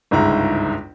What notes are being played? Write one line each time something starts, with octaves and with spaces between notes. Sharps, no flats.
G1 C#2 G#2 E4 A#5